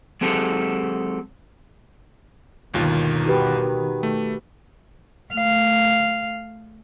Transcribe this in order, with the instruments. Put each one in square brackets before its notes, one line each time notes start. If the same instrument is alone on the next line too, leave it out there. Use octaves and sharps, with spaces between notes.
[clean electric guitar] F#3 G#3 C4 G4 A4
[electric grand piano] G1 D#2 F4 [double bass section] B2 D#3
[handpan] F#4 G4 B4
[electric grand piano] A3
[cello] A3 F5